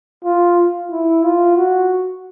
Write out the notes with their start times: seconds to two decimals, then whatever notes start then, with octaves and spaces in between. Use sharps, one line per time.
0.25 F4
0.91 E4
1.24 F4
1.57 F#4